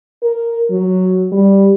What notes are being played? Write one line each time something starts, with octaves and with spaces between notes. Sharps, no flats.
A#4
F#3
G3